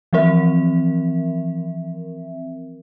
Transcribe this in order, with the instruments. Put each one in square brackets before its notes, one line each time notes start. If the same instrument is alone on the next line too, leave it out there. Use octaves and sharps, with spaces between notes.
[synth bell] E3 F3 C4 A#4 E5